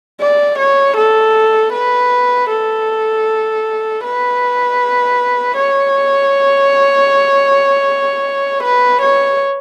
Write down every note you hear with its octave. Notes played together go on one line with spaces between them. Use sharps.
D5
C#5
A4
B4
A4
B4
C#5
B4
C#5